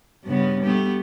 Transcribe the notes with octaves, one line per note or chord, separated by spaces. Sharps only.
G2 C#3 B3
A3 B3 G4